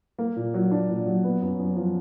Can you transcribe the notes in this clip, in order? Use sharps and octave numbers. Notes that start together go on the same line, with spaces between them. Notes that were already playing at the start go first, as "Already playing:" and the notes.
A#3
A#2
F#3
D4
A#2
F#3
B3
F#2
F#2
F3